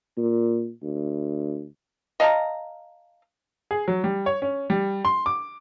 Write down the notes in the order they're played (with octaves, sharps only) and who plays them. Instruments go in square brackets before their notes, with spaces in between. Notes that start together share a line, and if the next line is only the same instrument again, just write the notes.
[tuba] A#2
D2
[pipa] D#5 F5 A5 A#5
[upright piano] G#4
F#3
G3
C#5
C#4
G3
C6
D6